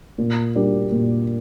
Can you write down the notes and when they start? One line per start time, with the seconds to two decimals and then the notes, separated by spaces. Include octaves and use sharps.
0.18 A#2
0.55 G3 A#3 D4 G4
0.92 A#2